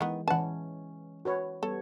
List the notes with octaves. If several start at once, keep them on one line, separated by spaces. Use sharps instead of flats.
D#3 E3 G#3 B3
E3 C#4 B4 F#5 A5
F#4 B4 C#5
G3 B3 A4 C#5